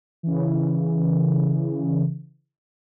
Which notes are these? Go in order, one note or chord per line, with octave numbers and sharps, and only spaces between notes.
C#3 E3